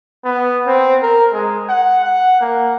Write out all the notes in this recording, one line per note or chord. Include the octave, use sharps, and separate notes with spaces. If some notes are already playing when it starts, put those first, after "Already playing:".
B3
C4
A#4
G#3
F#5
F#5
A#3